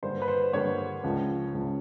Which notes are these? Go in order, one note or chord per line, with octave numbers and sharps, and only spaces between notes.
G2 D3 G3 A#3 D4 C5
B4
C5
G2 D3 G3 A#3 D4 C#5
C#2 C#3 F3
C#2 C#3 F3